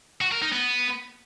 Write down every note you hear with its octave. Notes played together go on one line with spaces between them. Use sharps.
F#4
A#4
D#4
B3